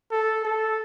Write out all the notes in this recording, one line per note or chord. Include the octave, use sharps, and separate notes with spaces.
A4
A4